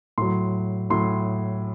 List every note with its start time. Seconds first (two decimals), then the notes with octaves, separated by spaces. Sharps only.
0.18 A2 F#3 C6
0.90 A2 F#3 C6